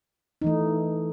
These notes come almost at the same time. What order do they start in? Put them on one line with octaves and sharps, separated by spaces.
D#4 E3 A3